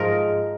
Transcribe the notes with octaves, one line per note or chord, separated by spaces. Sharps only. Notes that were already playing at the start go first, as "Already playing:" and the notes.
Already playing: G#2 F3 G#3 A#4